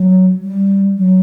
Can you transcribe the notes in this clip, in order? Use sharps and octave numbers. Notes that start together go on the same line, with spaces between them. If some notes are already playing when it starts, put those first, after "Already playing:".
Already playing: F#3
G3
F#3